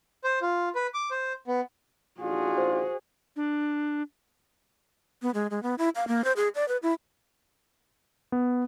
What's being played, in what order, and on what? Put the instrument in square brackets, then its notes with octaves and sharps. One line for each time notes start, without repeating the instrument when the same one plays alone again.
[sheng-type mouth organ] C5
F4
B4
D6
C5
B3
[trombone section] A1 D4 F4 [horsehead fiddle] F#4 G#4
[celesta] C5
[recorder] D4
[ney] B3
G#3
G#3
B3
E4
F5
A#3
C5
G#4
D5
B4
E4
[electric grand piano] B3